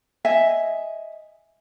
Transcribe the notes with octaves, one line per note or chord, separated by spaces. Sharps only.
D#5 E5 G#5